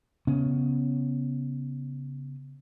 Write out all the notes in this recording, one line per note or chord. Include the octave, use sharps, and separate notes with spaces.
C#3 B3 C#4